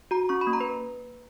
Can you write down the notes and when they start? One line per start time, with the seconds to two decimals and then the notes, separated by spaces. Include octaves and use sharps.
0.11 F#4 A#5
0.29 C#4 C#6
0.41 B5
0.47 A#3
0.53 A#5
0.61 B4